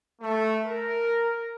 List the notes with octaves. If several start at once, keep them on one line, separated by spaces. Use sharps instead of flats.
A3
A#4